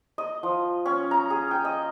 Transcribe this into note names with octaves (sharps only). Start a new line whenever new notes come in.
D#5
F3
C#4
A#5
G#4
G5
D#5